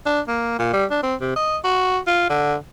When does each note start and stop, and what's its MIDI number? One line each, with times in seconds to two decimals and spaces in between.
0.06 0.20 62
0.28 0.54 58
0.59 0.69 46
0.73 0.85 55
0.91 1.01 62
1.03 1.15 60
1.21 1.36 48
1.36 1.58 75
1.64 1.99 66
2.07 2.28 65
2.29 2.55 50